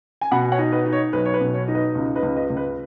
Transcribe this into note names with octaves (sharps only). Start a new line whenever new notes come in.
G#5
B2 F#5 B5
C#5 F#5
D#4
B4 D#5
D#4
C#5
B1 B4
C#5
B4
B2
C#5
D#4
B4 D#5
C#2
B4 D#5
C#2
B4 D#5
C#2
B4